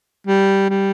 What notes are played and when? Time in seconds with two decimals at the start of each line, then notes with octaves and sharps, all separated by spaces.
0.27 G3
0.70 G3